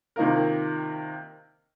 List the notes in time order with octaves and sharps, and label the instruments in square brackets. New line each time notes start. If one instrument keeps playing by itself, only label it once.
[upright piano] C3 D#3 A#3 F4 A#4